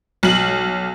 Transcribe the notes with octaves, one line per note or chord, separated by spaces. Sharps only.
B1 F#7